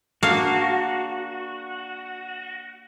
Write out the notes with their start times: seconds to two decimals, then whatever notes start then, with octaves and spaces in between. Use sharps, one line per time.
0.23 A#3 D4 F#4 G#4 F5